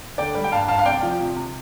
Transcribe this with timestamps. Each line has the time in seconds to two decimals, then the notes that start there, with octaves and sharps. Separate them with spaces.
0.18 D3 D5 G5
0.35 G3
0.44 G5
0.52 G2 F5 A5
0.68 G2 F5 A5
0.79 F5
0.86 C3 D5 G5
1.03 F3
1.19 C3
1.36 C3